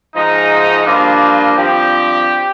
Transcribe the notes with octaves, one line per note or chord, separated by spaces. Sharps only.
G#2 F3 G#3 D#4
G2 F3 A#3 D4 F4
G2 F3 C4 G4